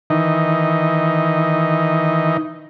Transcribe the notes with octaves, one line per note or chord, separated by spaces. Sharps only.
D#3 E3 D#4